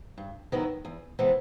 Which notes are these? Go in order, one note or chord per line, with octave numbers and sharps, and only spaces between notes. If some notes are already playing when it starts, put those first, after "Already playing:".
G2
D#3 F#3 B3 E4
E2
C3 E3 G#3 B3